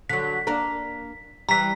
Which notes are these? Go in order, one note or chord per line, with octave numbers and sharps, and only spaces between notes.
D3 F#3 B6
A#3 D4 A#4
E3 G3 A#5 B6